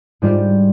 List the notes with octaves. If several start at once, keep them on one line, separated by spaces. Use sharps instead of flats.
G#2 G3 D4 F4 C5